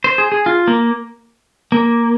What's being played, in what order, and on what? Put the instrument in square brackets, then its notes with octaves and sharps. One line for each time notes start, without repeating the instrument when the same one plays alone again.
[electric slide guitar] C5
G#4
G#4
F4
A#3
A#3